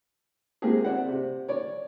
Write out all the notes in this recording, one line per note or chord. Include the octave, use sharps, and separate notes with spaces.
G#3 A#3 C4 F4 G4 G#4
C4 D5 E5 F#5
C3
C#5 D5